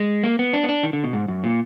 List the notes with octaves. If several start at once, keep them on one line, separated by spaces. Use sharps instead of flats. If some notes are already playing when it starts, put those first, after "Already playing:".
Already playing: G#3
A#3
B3
D4
B3
D4
D#3
D3
B2
G#2
F#2
A#2